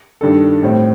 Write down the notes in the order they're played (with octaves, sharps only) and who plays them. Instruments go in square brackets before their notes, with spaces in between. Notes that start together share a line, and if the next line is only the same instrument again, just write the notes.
[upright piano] G2 D#3 G3 D4 A4
A2 G3 C4